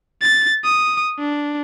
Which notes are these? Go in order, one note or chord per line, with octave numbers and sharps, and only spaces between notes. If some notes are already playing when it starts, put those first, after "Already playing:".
A6
D#6
D4